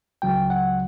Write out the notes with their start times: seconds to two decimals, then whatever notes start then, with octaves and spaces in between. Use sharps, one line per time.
0.22 C#2 C#3 F#3 G5
0.50 F#5